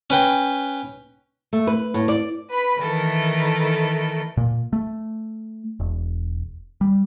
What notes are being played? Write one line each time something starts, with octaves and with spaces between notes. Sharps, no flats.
C#4 B4 G5
A3
B4
A2
D5
B4 B5
D#3 E3 A3 A4 A#4
A#2
A3
E1
G3